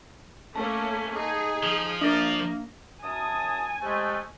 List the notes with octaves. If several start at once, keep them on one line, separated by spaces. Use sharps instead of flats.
A3 A#3 C#4 A5
D#4 G#4
F3
A#3 D4 D5 A#6
F#2 G#5 A5 D#6
C3 G#3 A3